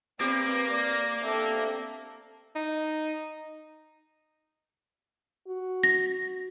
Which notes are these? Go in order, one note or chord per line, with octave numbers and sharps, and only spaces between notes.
A#3 C4 G4 B4 D5
D5 A#6
C4 D4 A4 E5
D#4
F#4
A#6